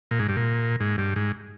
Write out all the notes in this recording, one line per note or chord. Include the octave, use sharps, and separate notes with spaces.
A#2
G#2
G2
A#2
G#2
G2
G#2